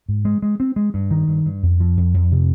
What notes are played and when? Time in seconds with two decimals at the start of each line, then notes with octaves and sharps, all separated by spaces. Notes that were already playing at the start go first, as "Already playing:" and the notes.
0.09 G#2
0.25 G#3
0.42 G#3
0.60 C4
0.76 G#3
0.94 G2
1.11 D#3
1.28 G2
1.46 G2
1.63 F2
1.80 F3
1.97 F2
2.14 F2
2.31 C3